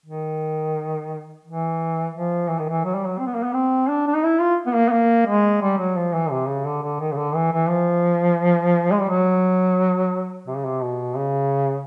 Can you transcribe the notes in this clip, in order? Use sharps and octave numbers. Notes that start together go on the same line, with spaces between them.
D#3
E3
F3
E3
D#3
E3
F#3
G3
F#3
C4
B3
A#3
B3
C4
D4
D4
D#4
E4
F4
B3
A#3
B3
A#3
G#3
G3
F#3
F3
E3
C3
C#3
D3
D3
D#3
C#3
D3
E3
E3
F3
G#3
G3
F#3
C3
C#3
C3
B2
C#3